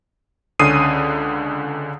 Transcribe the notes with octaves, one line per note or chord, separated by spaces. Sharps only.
C#2 D3 C#4 D#6 C7 D#7